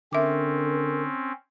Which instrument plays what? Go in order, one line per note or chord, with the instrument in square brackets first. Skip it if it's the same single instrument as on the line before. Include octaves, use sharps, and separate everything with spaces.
[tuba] D3 [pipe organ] C4 C#4 [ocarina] A#4 [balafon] E5 D6